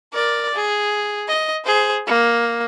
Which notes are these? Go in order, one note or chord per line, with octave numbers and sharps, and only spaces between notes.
A#4 D5
G#4
D#5
G#4 C5
A#3